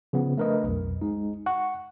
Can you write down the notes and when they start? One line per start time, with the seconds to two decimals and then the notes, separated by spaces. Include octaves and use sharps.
0.13 C#3 F3 B3
0.38 A3 D4 A#4 B4 D#5
0.64 B1 F2
1.01 G#3 D#4
1.46 F#5 C#6